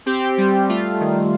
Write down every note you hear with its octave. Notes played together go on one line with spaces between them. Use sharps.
C4 G4
G3
A3 F4
D#3